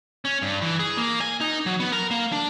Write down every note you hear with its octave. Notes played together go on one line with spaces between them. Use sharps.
C#4
G2
E3
G#4
A#3
G#5
D#4
F#3
B3
A#4
A#3
D4